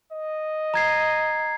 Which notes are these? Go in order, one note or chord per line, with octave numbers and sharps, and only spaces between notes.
D#5
A#5 G#6 C7